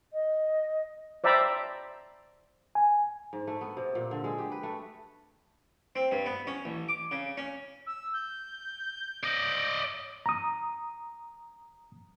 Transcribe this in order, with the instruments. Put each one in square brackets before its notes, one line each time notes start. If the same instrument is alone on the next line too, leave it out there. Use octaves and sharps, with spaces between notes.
[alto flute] D#5
[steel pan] C5 D5 E5 G5 A#5 B5
[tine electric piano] G#5
[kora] G#2
A3
B3
C3
A#2
D3
G#3
G4
B4
A3
[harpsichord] C4
G2
B3
C#4
A1
D6
C#3
C#4
[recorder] E6
G6
[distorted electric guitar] D5 D#5
[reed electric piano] A#5 D#6